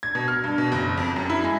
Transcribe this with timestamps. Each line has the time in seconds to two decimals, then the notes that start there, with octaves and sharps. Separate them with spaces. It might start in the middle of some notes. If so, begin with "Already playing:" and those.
0.03 G#6
0.15 B2
0.28 F6
0.44 G2
0.58 B2
0.72 F#1
0.97 F2
1.16 F#2
1.30 E4
1.44 G#3